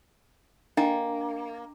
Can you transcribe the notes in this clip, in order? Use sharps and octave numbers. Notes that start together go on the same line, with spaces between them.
A#3 D4 D#5 G5